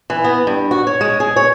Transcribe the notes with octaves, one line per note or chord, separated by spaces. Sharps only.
E3
B3
G2
F#4
C#5
G#3
G#4
C#5